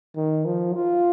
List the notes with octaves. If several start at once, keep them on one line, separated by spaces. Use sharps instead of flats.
D#3
F3
F4